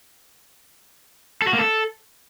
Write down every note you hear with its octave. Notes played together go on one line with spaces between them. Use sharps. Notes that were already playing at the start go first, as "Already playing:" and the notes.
A4
F#4
A#3
A4